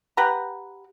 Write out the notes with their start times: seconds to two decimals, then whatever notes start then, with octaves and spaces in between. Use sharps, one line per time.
0.17 G4 B4 F#5 A#5